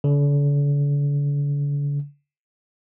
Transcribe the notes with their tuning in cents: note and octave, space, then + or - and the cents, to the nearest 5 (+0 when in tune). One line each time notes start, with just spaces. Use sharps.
D3 -40